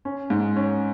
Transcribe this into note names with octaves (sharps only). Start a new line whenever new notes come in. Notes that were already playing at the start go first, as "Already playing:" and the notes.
C#4
G#2
C#4